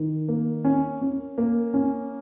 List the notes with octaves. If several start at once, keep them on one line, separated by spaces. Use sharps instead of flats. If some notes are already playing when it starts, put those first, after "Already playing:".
Already playing: D#3
A#3
C#4
C#4
A#3
C#4